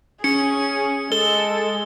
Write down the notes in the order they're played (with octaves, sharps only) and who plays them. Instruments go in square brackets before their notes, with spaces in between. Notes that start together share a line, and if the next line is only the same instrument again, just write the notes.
[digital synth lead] C#4 [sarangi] G#4 [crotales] C#7
[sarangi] G#3 [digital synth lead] A4 [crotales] G7